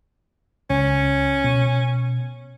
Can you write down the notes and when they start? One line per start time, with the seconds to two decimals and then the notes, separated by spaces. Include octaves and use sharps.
0.70 C#2 C#4
1.44 B2